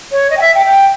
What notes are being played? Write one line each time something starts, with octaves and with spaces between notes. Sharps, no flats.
C#5
D#5
G5
E5
G5
G5